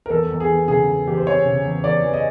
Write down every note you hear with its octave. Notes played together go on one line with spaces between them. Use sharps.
A#4
E2 A4
E2
G#4
E3
C#3 G#4
E2
E2 G4
C5
E3 C#5
C#3
E2
E2 D5
E3
D#5